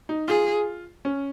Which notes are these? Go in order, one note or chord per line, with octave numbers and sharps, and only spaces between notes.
D#4
F4 G#4
C#4